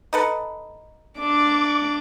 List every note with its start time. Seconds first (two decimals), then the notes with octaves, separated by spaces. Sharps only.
0.13 D#4 A4 B4
1.19 D4 D6